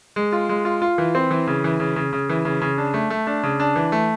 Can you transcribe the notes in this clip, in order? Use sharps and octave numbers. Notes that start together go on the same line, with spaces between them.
G#3
F4
G#3
F4
F4
E3
C4
E3
C#3
E3
C#3
C#3
C#3
E3
C#3
C#3
D4
A3
A3
D4
C#3
D4
E3
A3